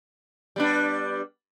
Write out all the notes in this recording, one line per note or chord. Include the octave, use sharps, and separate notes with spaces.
G3 B3 D4